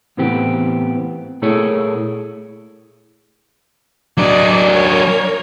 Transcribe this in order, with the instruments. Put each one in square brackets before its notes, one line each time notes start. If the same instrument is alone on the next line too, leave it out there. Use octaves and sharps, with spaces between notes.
[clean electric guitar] A2 C#3 E3 B3 C4 G4
A#2 A3 E4 G#4 C#5
[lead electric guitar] F#3 D4 [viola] D5 D#5
[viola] A#4 C#5